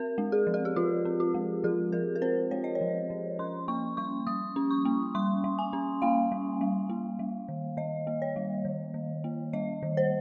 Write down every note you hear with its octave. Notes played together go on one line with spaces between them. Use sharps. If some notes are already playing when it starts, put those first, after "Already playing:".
Already playing: C4 A#4
G#3
G#4
F3
G#4
G4
F3 F4
C4
F4
G#3
F3 G#4
F3 A#4
A#4
C4 C5
G#3 C#5
D#5
C#5
F3
F3
C#4 C6
A#3 C#6
G3 C#6
G3 D#6
C#4
C#6
A#3
G3 C6
G3
G#5
C#4
A#3 F5
G3
G3
A#3
G3
D#3
D#3 D#5
A#3
C#5
G3
D#3
D#3
A#3
G3 D#5
D#3
C5